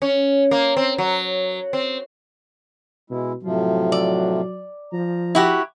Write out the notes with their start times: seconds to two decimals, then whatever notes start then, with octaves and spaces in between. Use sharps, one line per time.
0.02 C#4
0.51 A#3
0.77 C4
0.98 F#3
1.73 C4
3.10 B2 G#3 E4
3.43 A2 C3 F3 F#3
3.92 D5
4.92 F3 A#5
5.35 E4 F#4 G4